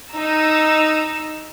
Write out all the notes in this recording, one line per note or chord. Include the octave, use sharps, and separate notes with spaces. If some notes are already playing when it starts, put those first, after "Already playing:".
D#4 A#5 E6